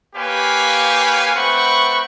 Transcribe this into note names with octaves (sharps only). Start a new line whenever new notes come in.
A#3 G4 B4 C#5 F5 G#5
A3 C4 B4 F#5 B5 C#6